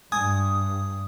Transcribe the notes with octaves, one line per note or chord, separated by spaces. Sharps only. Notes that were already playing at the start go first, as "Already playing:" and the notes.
G2 G#5 D#6